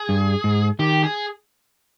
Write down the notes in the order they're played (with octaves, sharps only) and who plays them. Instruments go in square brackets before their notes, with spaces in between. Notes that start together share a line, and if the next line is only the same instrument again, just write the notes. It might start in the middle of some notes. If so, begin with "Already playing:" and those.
Already playing: [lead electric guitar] G#4
[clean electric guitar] G2
G#2
[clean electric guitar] D#3 [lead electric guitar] G4
[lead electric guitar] G#4